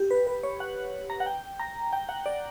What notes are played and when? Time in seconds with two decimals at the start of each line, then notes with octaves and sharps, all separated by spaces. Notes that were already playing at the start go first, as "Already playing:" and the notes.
Already playing: G4
0.11 B4
0.27 B4
0.43 C#5
0.60 F#5
1.10 A#5
1.20 F#5
1.26 G5
1.60 A#5
1.93 G5
2.09 F#5
2.26 D5